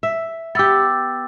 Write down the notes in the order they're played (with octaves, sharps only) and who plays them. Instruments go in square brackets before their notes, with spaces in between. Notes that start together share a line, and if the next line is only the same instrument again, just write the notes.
[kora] E5
[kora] B3 G4 [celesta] D6 E6 A6